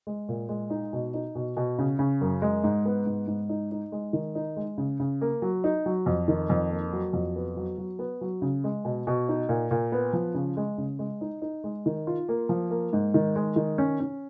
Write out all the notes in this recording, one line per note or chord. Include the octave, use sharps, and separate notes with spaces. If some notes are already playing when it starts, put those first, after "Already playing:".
G#3
A#2
G#3
D#4
B2
D#4
B2
B2
C#3
C#3
F#2
G#3
G#2
B3
G#2
G#2
D#4
D#4
G#3
D#3
D#4
G#3
C#3
C#3
A#3
F#3
D#4
F#3
F2
D#3
F2
A#3
F#3
F2
B3
F#3
F#3
B3
F#3
C#3
G#3
B2
B2
D#4
A#2
A#2
B3
F3
C#3
G#3
C#3
G#3
D#4
D#4
G#3
D#3
F4
A#3
F3
A#3
G#2
D#3
G#3
D#3
C#4
C#4